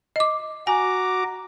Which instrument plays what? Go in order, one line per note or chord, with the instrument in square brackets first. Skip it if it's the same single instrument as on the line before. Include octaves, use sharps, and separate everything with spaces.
[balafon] D#5 D6
[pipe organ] F#4 A#5 D6 [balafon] G#5